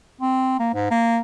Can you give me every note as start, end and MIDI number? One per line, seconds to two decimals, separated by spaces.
0.21 0.59 60
0.60 0.72 58
0.74 0.90 44
0.91 1.18 58